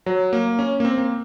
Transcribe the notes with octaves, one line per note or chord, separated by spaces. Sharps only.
F#3
A#3
C#4
A#3
C4
A#3